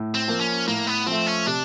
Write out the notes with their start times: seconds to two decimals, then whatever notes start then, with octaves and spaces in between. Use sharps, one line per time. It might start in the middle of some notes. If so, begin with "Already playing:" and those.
Already playing: A2
0.15 C4
0.28 F3 A#3
0.40 C#4
0.68 A2 A#3
0.87 B3
1.06 F3 A3 C4
1.26 C#4
1.46 C3 D4